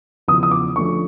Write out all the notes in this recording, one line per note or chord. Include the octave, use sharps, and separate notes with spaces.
E2 C#3 F3 D#6
D#6
D6
D3 F3 A3 C#4 C#6